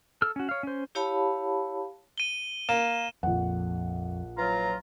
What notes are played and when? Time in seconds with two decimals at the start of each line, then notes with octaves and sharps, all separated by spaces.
0.22 A4 E6 F6
0.36 C#4 F#4
0.49 C#5 F5
0.63 C#4 C5
0.95 E4 G4 C#5 F5 A5 B5
2.18 D#7 G7
2.69 A#3 E7
3.23 A#1 F2 F#5
4.38 E3 F#3 F4 A#5